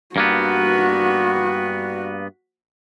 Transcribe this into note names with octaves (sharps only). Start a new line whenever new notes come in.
G2 A#3 B3 F#4